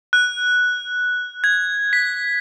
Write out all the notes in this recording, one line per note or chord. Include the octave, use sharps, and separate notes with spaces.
F#6
G#6
B6